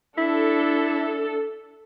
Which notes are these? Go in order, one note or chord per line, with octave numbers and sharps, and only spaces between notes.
D4 E4 A4